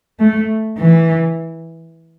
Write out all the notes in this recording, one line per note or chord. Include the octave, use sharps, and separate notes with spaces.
A3
E3